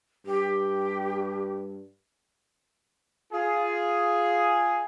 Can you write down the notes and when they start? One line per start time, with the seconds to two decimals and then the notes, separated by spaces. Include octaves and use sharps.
0.26 G2 G4
3.33 F4 G#4